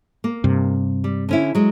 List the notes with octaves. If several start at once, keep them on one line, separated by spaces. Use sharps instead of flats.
A#3
G2 C3
G3
D3 C#4 E4
F#3 G#3